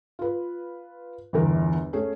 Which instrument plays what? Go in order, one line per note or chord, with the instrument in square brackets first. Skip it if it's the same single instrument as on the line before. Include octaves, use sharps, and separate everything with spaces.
[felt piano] F4 B4
G1 E2 A#4
A3 C#4 G#4